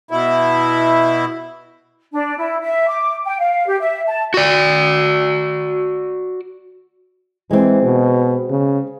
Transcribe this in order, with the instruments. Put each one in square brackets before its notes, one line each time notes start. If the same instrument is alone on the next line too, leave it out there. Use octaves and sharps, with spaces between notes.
[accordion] B2 E4
[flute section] D4
E4
E5
D6
G5
F5
G4
E5
A5
[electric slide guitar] F#4 D5
[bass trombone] E3 [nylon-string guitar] G#3 C4
[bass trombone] B2
C#3